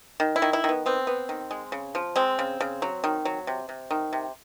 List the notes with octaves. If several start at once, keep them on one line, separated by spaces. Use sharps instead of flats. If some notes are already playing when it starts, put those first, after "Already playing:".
D#3
E4
D#3
E4
D#3 B3
B3 C4
B3
D#3
G#3
C#3
F3
G#3 C4
C#3
C#3
F#3
D#3
F#3
C3
C3
D#3
C3